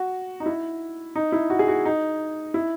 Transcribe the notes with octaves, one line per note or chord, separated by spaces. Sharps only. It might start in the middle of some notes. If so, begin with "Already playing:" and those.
Already playing: F#4
D#4
E4
D#4
E4
F#4
G#4
F#4
D#4
E4